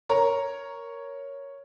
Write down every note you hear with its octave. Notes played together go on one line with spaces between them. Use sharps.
A#4 C#5 A#5